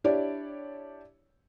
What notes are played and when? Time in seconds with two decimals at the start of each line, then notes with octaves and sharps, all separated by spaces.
0.04 D4 E4 G4 C#5 D5